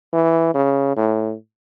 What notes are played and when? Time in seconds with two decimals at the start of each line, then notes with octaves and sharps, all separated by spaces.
0.13 E3
0.54 C#3
0.96 A2